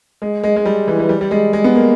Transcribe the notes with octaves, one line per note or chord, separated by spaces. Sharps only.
G#3
G#3
G#3
G3
E3
E3
G3
G3
G#3
G#3
B3
A#3